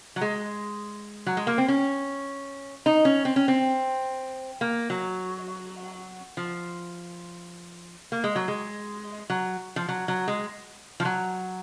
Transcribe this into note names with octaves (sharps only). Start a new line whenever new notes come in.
F#3
G#3
F#3
G#3
A#3
C4
C#4
D#4
C#4
C4
C#4
C4
A#3
F#3
F3
A#3
G#3
F#3
G#3
F#3
F3
F#3
F#3
G#3
F3
F#3